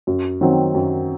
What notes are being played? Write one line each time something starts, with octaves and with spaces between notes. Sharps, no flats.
F#2
D#3 F#3 C4
F#2